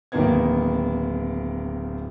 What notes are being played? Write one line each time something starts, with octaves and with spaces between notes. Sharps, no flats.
D1 D#3 A#3 B3 G#6